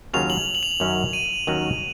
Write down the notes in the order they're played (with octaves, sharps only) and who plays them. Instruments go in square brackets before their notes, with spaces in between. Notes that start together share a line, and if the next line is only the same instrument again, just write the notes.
[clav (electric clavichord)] D#2 C#3 F#3 C#4 F4 [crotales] F7
[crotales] F#7
F#7
F7
F#7
[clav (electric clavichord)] F#2 D#3 F#3 C#4
[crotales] D#7
[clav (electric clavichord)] D#2 D#3 F#3 C#4 F#4